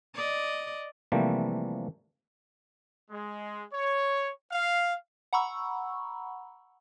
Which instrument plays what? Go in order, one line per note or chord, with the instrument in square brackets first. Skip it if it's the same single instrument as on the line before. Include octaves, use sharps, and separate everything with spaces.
[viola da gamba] D5 D#5
[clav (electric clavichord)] C3 E3 F3 G3 A3 A#3
[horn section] G#3
C#5
F5
[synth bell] F#5 A#5 B5 C#6 E6